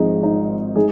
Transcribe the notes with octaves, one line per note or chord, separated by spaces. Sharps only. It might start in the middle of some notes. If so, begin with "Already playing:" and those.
Already playing: G#1 G#2 F3 G#3 D#4
D#4
G#3 D#4 G#4